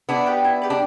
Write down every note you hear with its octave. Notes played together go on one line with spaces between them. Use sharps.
B3 D4 E4
G4 B4
E4
G4 B4
D4